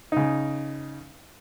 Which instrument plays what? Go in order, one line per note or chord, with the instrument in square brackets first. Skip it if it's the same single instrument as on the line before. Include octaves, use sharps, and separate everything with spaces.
[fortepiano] C#3 D#4